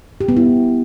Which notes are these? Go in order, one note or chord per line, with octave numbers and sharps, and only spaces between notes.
G4
B3
E4